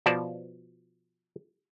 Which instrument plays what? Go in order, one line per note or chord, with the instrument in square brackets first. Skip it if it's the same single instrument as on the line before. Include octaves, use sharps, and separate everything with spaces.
[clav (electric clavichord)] B2 F3 D5 A5